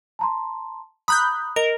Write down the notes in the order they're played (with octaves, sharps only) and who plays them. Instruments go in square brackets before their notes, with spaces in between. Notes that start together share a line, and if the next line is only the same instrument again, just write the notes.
[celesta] A5 A#5 C6
[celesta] A#5 D#6 [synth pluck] B5 F#6 G6
[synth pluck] A#4 [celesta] D#5